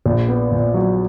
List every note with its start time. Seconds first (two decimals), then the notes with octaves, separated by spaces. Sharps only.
0.06 A#1
0.28 B3
0.52 A#2
0.74 F#3